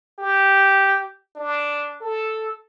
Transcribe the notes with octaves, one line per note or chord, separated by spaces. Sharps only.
G4
D4
A4